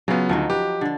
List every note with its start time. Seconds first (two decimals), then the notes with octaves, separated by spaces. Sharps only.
0.08 C#3 F#3 B3 F4
0.29 D2 F3 F#3 D#4
0.50 G4 B4
0.81 D3 D4